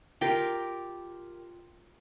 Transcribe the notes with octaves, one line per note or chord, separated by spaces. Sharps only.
F4 G4 A#4 G5